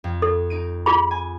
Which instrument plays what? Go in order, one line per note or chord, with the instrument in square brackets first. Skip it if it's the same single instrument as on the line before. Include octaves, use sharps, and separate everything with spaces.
[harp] F2
[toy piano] A4
[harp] D#4 D7 D#7
[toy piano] F4 G#4 B5
[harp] G#5